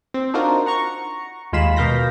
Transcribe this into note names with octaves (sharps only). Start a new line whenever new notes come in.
C4
D4 D#4 F4 F#4 A#4 C5
F#5 A#5 C#6
D#2 G#3 F4 F5 B5 E7
B2 A#4 F5 G6 A#6 B6